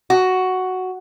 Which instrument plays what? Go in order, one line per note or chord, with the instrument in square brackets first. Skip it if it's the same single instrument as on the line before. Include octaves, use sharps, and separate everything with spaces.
[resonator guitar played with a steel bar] F#4